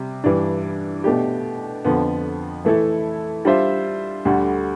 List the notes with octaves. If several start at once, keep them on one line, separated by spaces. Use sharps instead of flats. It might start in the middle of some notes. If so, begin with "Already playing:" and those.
Already playing: C3 G3
G2 E3 G3 D4
B2 A3 D4 G4
F2 D3 F3 B3
E3 A3 E4 A4
G3 D4 F4 C5 E5
D2 D3 G3